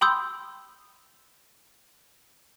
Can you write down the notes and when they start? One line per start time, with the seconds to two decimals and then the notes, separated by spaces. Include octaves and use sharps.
0.01 G5 B5 C6 D#6 E6 G6